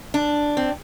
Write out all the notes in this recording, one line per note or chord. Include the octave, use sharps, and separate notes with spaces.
D4
C4